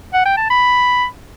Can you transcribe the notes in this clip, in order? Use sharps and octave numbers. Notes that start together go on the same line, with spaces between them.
F#5
G5
A5
B5